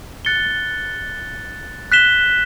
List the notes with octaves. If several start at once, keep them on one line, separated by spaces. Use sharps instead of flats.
F#6 A6 C#7 G7
F#6 B6 E7 G7